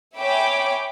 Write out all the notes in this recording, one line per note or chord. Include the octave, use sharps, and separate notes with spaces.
C#5 E5 G5 G#5 B5 D6